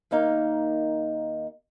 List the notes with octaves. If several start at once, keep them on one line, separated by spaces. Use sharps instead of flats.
D#2 A#3 D#4 F5